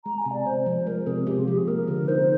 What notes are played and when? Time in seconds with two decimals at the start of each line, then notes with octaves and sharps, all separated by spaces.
0.05 G#3 A#5
0.18 G#5
0.26 C3
0.32 D5
0.46 C3 C5
0.66 F3
0.87 G#3 A#4
1.07 C3 G#4
1.27 C3 G4
1.37 F4
1.47 F3 G4
1.57 G#4
1.68 A#3 A#4
1.88 D3
2.08 D#4 C5